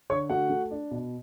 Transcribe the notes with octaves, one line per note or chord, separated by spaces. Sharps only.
D3 C#5 C#6
A3 F#4 F#5
A3
D4
B2